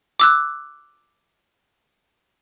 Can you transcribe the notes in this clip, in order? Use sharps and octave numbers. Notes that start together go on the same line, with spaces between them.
D6 E6 F#6